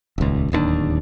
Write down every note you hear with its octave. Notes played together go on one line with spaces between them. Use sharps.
D#1 C#2
D1 D#2 C4 D4